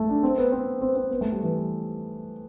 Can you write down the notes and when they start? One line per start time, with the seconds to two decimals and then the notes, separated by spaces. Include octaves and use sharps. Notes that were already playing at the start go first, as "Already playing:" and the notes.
Already playing: A3
0.09 D4
0.23 C4
0.38 B3
0.52 C4
0.81 C4
0.96 C4
1.11 B3
1.21 A3
1.32 G3
1.43 E3